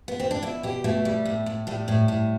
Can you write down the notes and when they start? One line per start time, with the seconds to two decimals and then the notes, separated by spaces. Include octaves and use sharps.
0.08 B3
0.20 C4
0.31 D4
0.42 B2 E4
0.63 B2 G4
0.84 B2 A3
1.05 G3
1.26 A2
1.46 A2
1.67 A2 G3
1.88 A2
2.08 A2